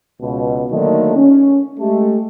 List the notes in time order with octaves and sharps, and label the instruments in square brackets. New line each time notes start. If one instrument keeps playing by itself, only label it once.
[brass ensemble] C#2 B2
D3 D#3 F#3 A3 A#3 D#4
C#4
G#3 A3 G4